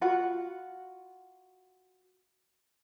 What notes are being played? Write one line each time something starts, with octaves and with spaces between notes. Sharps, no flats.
F4 F#4 F#5 B5